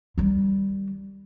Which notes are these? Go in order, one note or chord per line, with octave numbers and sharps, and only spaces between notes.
D#3 G3